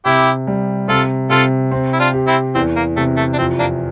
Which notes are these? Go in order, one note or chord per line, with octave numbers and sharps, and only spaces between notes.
C3 E4 G4
G3
C3 F4 A4
C3 F4 A4
C4
E4
D4 F4
G4
C4 E4
E2 C4
A#3
C3 A3
A3
D4
F2 C4
A#3 D4